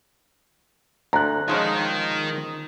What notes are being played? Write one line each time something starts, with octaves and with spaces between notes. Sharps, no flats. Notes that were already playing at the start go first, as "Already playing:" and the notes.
D2 A#5 F#6
D#3 F3 G#3 C#4